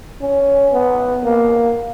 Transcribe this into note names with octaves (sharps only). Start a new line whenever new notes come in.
C#4
B3
A#3